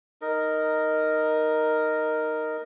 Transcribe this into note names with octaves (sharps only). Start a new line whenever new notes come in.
D#4 A#4